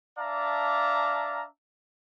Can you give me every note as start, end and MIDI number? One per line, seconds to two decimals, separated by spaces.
0.19 1.45 62
0.19 1.45 74
0.19 1.45 76
0.19 1.45 77
0.19 1.45 81
0.19 1.45 82